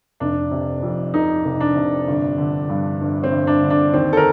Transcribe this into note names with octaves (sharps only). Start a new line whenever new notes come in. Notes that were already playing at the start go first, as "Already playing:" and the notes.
F1 D4
C3
F2
F1 D#4
F1
D4
C3
G1
D3
G2
G1
C4
G1
D4
D3
D4
D#2 C4
A4
A#4